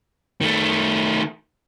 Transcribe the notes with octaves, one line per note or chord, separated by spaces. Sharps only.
D#3 A3